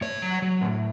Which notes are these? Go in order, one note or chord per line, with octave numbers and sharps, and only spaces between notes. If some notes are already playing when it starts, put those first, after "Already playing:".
A2 C#5
F#3
F#3
A2